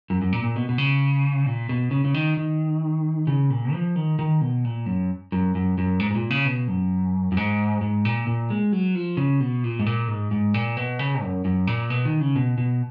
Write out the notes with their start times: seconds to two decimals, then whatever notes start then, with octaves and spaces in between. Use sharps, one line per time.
0.10 F#2
0.22 F#2
0.33 A#2
0.43 A#2
0.56 B2
0.69 B2
0.78 C#3
1.46 A#2
1.69 B2
1.91 C#3
2.05 C#3
2.14 D#3
2.37 D#3
3.27 C#3
3.50 A#2
3.73 F3
3.96 D#3
4.19 D#3
4.41 B2
4.64 A#2
4.86 F#2
5.32 F#2
5.55 F#2
5.78 F#2
6.00 G#2
6.11 G#2
6.15 A#2
6.30 C#3
6.45 B2
6.68 F#2
7.32 F#2
7.37 G#2
7.81 G#2
8.05 A#2
8.27 A#2
8.50 G#3
8.72 F#3
8.95 F3
9.17 C#3
9.40 B2
9.64 A#2
9.79 G#2
9.86 A#2
10.08 G#2
10.31 G#2
10.54 A#2
10.77 B2
10.99 C#3
11.22 F#2
11.45 F#2
11.67 A#2
11.90 B2
12.05 D#3
12.20 C#3
12.36 B2
12.58 B2